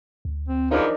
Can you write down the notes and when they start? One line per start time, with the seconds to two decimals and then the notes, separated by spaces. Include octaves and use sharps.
0.25 D2
0.49 C4
0.71 E2 F3 D4 D#4 A#4